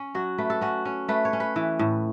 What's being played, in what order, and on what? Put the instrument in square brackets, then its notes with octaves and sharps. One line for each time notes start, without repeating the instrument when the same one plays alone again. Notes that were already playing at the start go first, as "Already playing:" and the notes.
Already playing: [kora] C#4
F#3 F#4
A3 B4
A4
C#4 F#4
C#4
A3 B4
C#5
C#4
B4
E3
A2